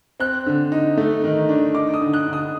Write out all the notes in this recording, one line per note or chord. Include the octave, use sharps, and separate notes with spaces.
C4 F#6
D3
D#4
A3
D#3
D4
D#4 D6
D#6
D3
F#6
D3
D#6